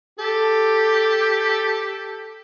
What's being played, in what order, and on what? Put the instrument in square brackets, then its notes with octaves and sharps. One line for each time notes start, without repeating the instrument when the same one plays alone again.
[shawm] G4 [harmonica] A4